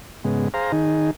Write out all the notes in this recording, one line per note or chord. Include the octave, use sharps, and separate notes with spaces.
G#2 C#3 G#3 B3
G#4 C5 F5 A#5
D#3 D#4 G#4